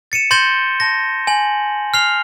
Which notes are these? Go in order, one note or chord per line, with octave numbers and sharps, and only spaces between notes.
A6 C#7 D#7 E7
C6 G6 A6 A#6 E7 G7
A5 A#6
G#5 F#7
F6 C7 F7 G7